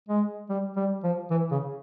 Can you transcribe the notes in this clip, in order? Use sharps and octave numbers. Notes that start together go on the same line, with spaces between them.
G#3
G3
G3
F3
E3
C#3